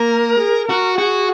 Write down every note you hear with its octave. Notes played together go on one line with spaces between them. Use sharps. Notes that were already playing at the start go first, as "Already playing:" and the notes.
Already playing: A#3 A#4
G#4
F#4 A#4
F#4 G#4